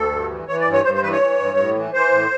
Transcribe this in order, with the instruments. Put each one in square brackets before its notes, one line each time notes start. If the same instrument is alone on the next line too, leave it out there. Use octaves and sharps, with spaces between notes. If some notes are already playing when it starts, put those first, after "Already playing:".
Already playing: [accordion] D2 A4
G2
E3
E3 C#5
D5
G2
C#5
G2 C5
C5
E3 B4
C#5
E3
G2
A2
E3
E3 C5
A2